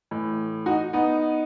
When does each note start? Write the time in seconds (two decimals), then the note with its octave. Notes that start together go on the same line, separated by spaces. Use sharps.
0.11 A2 E3
0.66 D#4 F#4
0.93 B3 D#4